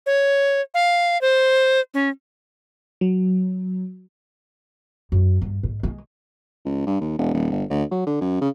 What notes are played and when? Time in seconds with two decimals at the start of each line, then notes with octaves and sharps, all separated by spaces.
0.06 C#5
0.74 F5
1.21 C5
1.94 C#4
3.01 F#3
5.12 F#2
5.42 G2
5.63 G#2
5.83 G#3
6.65 C#2
6.87 G2
7.00 D#2
7.18 E1
7.34 D#1
7.51 G1
7.70 D2
7.91 F#3
8.07 D3
8.21 F#2
8.41 C#3